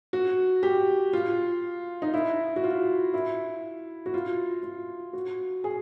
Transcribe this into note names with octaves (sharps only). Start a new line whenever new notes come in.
F#4
G4
F4
D#4
E4
F#4
F4
E4
F#4
F4
F4
F#4
G#4